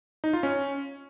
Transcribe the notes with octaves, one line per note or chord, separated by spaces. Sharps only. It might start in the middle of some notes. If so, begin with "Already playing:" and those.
D#4
F4
C#4